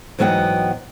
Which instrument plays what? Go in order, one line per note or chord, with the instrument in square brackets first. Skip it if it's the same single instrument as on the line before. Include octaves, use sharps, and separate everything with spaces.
[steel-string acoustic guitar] G#2 E3 F#3 B3 D#5 G5